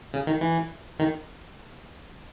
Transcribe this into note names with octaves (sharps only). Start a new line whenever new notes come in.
C#3
D#3
E3
D#3